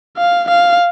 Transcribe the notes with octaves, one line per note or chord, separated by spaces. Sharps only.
F5
F5